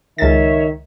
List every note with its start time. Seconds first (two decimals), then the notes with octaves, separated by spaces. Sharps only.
0.18 C#2 D#3 C#5 E5 A6